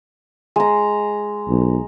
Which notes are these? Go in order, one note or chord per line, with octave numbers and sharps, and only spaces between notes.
G#3 A#5
B1